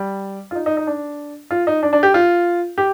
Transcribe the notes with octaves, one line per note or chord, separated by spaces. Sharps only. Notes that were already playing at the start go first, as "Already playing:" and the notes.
Already playing: G3
F4
D#4
D#4
D#4
D4
F4
D#4
D4
D4
G4
F4
G4